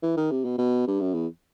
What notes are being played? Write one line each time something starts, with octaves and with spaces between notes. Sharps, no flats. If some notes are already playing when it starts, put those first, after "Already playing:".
E3
D#3
C3
B2
B2
G2
F#2
E2